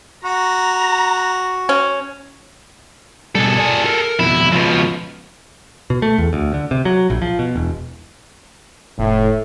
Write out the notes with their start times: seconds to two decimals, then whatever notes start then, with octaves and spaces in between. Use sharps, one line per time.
0.25 F#4 A#5
1.69 C#4
3.35 B2 G3 G#4 A4
3.58 D5 G#5
3.85 A#4
4.19 F2 B2 E4
4.52 C#2 B2 F3
5.90 B2
6.02 A3
6.18 E2
6.33 D2
6.54 D3
6.71 C3
6.85 F#3
7.10 A#1
7.22 F3
7.39 B2
7.56 E1
8.98 F1 A2